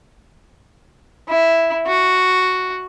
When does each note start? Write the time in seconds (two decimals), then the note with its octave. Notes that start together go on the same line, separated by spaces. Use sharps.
1.28 E4
1.87 F#4